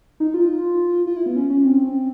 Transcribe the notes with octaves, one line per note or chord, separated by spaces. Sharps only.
D#4
F4
F4
E4
B3
C#4
C#4
C4